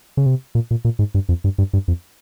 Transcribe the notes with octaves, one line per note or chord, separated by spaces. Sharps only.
C#3
C3
A#2
A#2
A#2
G#2
G2
F2
G2
G2
G2
F2